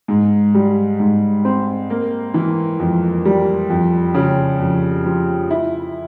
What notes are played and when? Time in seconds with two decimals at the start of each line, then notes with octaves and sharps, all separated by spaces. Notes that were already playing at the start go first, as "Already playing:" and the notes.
0.08 G#2
0.55 G3
1.00 G#2
1.45 C4
1.90 A#3
2.34 E3
2.80 F2
3.25 G3
3.70 F2
4.14 C#3
4.60 F2
5.05 F3
5.51 E4